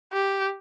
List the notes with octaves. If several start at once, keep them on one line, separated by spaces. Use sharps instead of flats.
G4